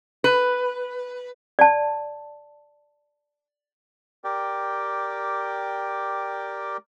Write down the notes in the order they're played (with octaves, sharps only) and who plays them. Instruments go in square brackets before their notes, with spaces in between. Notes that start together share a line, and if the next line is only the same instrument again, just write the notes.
[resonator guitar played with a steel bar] B4
[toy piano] D5 A5
[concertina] G4 A#4 D5 G5